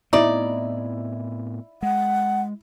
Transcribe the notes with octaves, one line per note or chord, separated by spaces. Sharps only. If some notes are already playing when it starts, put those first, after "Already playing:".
A2 B3 C4 D#4 E4 D5
G#3 F#5